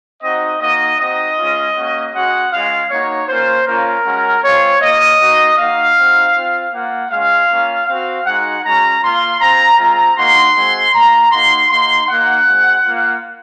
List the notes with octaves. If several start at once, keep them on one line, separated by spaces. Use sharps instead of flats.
C4 D#4 F#4 D#5
A#3 D#4 F#4 D#5
C4 D#4 F#4 D#5
G#3 C#4 F4
A#3 C#4 F#4
G#3 C#4 F#4 F#5
G#3 C#4 F4 F5
A#3 D#4 F#4 C#5
A#3 C#4 F4 C5
A#3 C#4 F4 A#4
G#3 C#4 F#4
G#3 C4 F4 C#5
A#3 F4 D#5
A#3 D#4 F#4
A#3 D#4 F#4 F5
C4 D#4 F#4
C4 F4
A#3 F4 F#5
G#3 C#4 F4 F5
A#3 C#4 F4
C4 F#4 F5
G#3 D#4 F#4 F#5
G#3 C#4 F#4 A#5
A#3 F4 C6
C4 F4 A#5
G#3 C4 F4 A#5
A#3 D#4 F#4 C6
G#3 C4 F#4
A#3 F4 A#5
A#3 D#4 F#4 C6
A#3 D#4 F#4 C6
A#3 D#4 F#4 F#5
G#3 C4 F#4
A#3 F4